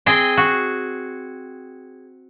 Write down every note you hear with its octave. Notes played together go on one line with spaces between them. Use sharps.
C4 G#4 D#5 G5
F#4